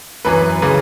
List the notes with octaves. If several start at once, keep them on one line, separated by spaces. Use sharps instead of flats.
F#2 E3 B4
C#3 E3